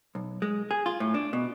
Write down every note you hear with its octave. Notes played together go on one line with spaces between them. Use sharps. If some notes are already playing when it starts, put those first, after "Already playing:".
B1
G#3
G#4
F4
A2
D4
B2